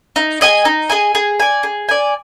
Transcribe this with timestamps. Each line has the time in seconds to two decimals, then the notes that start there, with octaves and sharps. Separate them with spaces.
0.16 D#4
0.41 G#4 D#5 G#5
0.65 D#4
0.89 G#4 D#5 G#5
1.15 G#4
1.40 D5 G#5
1.63 G#4
1.89 D5 G#5